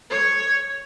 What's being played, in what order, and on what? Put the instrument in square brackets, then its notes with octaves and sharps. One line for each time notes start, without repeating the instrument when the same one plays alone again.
[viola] C#5